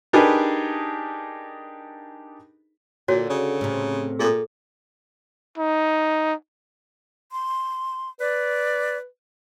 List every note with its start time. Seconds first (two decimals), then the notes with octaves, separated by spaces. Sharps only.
0.13 D4 D#4 G4 G#4 A#4 B4
3.08 A#2 D3 F#4 C#5
3.30 C#3
3.61 A2 C3
4.19 A#2 G#4 A4
5.58 D#4
7.32 C6
8.20 B4 D5